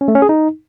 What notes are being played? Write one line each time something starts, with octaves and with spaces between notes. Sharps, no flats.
C#4
A3
C#4
G#4
D#4